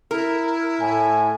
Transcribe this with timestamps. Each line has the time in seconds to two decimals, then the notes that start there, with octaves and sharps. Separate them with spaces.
0.11 E4 A#4
0.81 A2 G#5